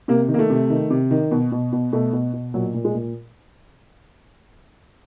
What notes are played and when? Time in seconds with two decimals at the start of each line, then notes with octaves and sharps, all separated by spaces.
0.08 C3 A#3
0.28 D#3
0.34 A#3
0.39 A3
0.50 C3
0.70 D#3
0.90 C3
1.11 D#3
1.31 B2
1.52 B2
1.73 B2
1.93 B2 A3
2.13 B2
2.33 B2
2.54 A#2 F#3
2.74 A#2
2.85 G#3
2.95 A#2